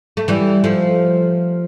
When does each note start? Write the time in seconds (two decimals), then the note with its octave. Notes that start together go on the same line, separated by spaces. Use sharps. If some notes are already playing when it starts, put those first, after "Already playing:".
0.17 A3
0.28 E3 G3
0.64 F3 A3